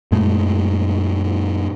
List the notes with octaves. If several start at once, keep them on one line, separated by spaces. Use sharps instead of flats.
F#2 A#2 G#3 A3